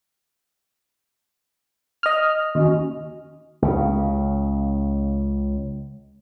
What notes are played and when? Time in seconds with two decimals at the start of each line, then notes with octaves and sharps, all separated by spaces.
2.03 D#5 F6
2.55 D#2 C#4 F#4 D#5
3.62 C#2 C#3